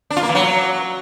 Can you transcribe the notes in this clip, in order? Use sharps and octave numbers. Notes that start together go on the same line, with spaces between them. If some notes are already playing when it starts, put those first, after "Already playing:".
D4
F4
A#3
E3
F#3